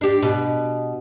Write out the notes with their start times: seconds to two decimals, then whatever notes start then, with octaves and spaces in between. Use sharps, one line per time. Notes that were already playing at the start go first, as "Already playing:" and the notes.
0.01 D4 G4
0.23 B2